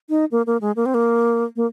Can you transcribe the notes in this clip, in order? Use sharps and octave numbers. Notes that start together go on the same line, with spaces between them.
D#4
A#3
A#3
G#3
A#3
C4
A#3
A#3